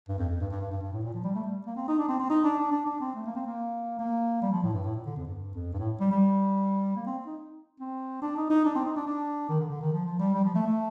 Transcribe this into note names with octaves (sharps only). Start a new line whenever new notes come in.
G2
F2
F2
G2
G2
G2
G2
G2
A2
A#2
F3
G3
A3
G3
A#3
C4
D#4
D4
C4
C4
D#4
D4
D4
D4
D4
C4
A3
A#3
C4
A#3
A#3
G3
F3
A2
G2
A2
A#2
D3
F2
G2
G2
F2
G2
A2
G3
G3
A#3
C4
D#4
C4
D4
D#4
D#4
D4
C4
D#4
D4
D4
D#3
D3
D3
D#3
F3
F3
G3
G3
F3
A3
A3